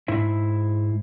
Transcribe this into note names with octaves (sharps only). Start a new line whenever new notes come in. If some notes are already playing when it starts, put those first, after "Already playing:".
G#2 E4 C5 E5